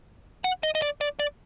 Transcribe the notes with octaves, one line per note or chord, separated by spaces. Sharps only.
F#5
D#5
D#5
D5
D5
D5